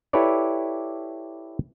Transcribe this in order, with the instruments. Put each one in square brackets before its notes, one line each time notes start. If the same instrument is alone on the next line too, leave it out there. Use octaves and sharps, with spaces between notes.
[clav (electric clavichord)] E4 G4 A4 B4 C#5 D5